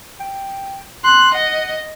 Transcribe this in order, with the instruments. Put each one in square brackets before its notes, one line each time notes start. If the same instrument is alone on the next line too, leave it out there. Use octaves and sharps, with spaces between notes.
[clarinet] G5
[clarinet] C6 [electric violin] F#6
[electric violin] D#5 [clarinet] F#5